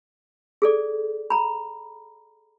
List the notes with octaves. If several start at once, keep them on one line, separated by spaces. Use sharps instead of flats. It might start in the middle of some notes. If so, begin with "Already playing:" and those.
G#4 A4 D5
A#5 B5